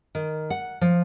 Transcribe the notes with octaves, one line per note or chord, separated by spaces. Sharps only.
D#3
F#5
F3